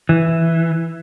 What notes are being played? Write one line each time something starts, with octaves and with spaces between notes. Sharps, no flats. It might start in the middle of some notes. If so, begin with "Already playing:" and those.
E3